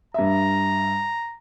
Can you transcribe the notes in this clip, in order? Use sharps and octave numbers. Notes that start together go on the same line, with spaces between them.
G2 E5 A#5